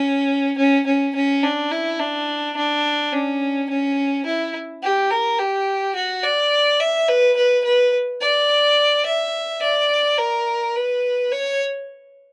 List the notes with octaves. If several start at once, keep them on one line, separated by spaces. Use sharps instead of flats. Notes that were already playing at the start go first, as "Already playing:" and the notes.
Already playing: C#4
C#4
C#4
C#4
D4
E4
D4
D4
C#4
C#4
E4
G4
A#4
G4
F#4
D5
E5
B4
B4
B4
D5
E5
D5
A#4
B4
C#5